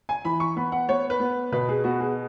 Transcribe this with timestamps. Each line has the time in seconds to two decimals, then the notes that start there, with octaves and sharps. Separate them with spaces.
0.09 G#5
0.25 E3 B5
0.40 C#6
0.56 B3 B5
0.72 F#5
0.89 B3 C#5
1.10 B4
1.20 B3
1.52 B2 B4
1.69 G#4
1.84 B3 F#4
2.00 G#4